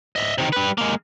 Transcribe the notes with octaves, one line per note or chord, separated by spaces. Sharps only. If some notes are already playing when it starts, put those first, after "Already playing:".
D#5 E5
C3 D#3
G3 B4
G#3 A#3